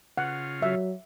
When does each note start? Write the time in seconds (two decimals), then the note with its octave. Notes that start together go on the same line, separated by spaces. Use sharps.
0.18 C#3 F4 F#5
0.62 F#3 E5